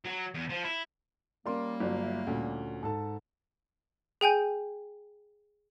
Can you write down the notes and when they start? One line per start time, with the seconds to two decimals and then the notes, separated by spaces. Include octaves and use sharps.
0.05 F#3
0.34 E2
0.49 F3
0.64 E4
1.46 G3 A#3 C#4 A#4 D5 C6
1.80 G1 F#3
2.03 E5
2.27 D2 A#2 C#4
2.83 G#2 A4 A5
4.21 G#4 G5 G#5 G6